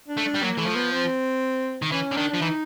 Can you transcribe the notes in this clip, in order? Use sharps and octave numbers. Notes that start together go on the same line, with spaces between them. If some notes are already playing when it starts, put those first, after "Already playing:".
D4
A3
D4
G3
F#3 A#3
E3 A3
F3
B3
C4
D#3
E3 C#4
D3
D#3 D4
F3 D4
E3 D#4